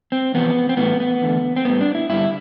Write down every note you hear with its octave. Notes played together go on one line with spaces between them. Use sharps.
C4
E2 C3 F3 B3
C4
A2 E3 A3 B3
B3
E2 D3 A3
C4
A2 G3 B3
D4
E4
G2 D3 G3 E4